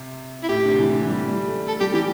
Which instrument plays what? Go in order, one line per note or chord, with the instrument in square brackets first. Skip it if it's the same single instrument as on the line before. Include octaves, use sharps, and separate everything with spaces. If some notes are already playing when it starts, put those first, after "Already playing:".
Already playing: [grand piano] C3
[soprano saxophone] E4
[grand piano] A2 [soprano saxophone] G4
[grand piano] D3
C3
E3
D3
E3
G3
G3
A3
[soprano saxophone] A4
[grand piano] G3 [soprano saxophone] G4
[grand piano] E3 [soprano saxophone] G4